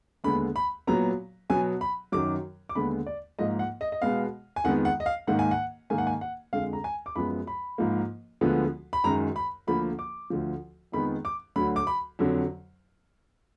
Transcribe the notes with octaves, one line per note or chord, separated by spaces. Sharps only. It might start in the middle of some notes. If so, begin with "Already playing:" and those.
D#2 D3 G#3 B3 B5
B5
A#2 F#3 B3 A#5
B2 F#3 B3 G#5
B5
F#2 D#3 F#3 D6
D6
D#2 D3 G#3 B3 B5
D5
G#2 F3 A#3 D#5
F#5
D#5
D#5
B2 G#3 B3 F5
G#5
F2 D#3 G#3 B3 F#5
F#5
D#5
F5
G#2 D#3 A#3 F#5
G#5
F#5
G#2 D#3 A#3 G#5
F#5
G#5
F#5
F2 D3 G#3 F5
A#5
G#5
D6
F#2 F3 G#3 B3 B5
B5
G#2 F3 A#3
D2 D3 F3 G#3 B3
B5
F#2 D#3 G#3 A#5
B5
D2 D3 F3 A#3 B5
D6
D2 D3 F3
F2 D#3 G#3 B3 B5
D6
D2 D3 F#3 B5
D6
B5
F2 D3 F#3